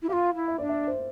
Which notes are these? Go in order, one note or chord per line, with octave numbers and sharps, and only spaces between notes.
E4
F4 G4 F5
E4
E5
D4 D5
E5
C5